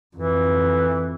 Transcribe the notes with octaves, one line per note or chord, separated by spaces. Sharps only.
F2 E3